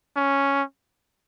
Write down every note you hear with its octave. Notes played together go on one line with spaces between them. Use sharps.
C#4